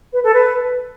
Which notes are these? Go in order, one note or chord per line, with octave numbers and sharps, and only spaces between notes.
B4
A4
B4